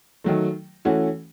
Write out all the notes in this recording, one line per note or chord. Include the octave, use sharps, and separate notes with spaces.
D#3 F#3 A3
E3 A3 C#4 F#4